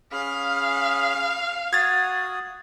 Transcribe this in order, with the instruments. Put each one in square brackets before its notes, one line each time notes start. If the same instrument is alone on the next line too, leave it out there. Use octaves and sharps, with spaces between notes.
[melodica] C#4 G#4 B5 [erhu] F5
[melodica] F#4 D#6 [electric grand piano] G#6 A6